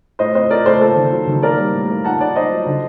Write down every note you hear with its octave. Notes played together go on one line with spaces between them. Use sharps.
A2 C5 D#5
C4 C5 D#5
C4 A#4 D5
A2 A4 C5
A#3 A4 C5
D#3
F#3
D#3
A#3 A#4 D5
G3
A2
A#3
D#4 F#5 A5
D#4 D5 F#5
D#4 C5 D#5
F#3
D3